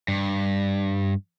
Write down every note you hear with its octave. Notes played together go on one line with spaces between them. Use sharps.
G2